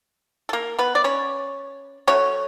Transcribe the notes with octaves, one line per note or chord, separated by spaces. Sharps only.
A4
A#3 A#4
B3 B4
D5
C#4 C#5
F#3 A3 C#4 C#5